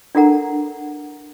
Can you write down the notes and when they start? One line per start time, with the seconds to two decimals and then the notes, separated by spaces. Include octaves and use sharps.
0.15 D4 E4 A4 A#4 F#5 A#5